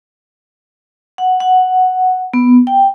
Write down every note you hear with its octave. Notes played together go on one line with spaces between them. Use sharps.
F#5
F#5
B3
G5